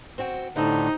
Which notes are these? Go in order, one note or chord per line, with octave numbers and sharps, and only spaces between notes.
C4 F#4 G5
A2 D3 G3 C4 D#4